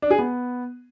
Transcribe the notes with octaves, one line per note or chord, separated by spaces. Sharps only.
D4
G#4
B3